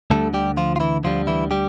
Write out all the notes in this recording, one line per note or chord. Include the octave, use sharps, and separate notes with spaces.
D2 D3 G3 A3 A4
G3 G4
F3 F4
F4
E3 E4
D2 D3 F3 G3 F4
E3 E4
G3 G4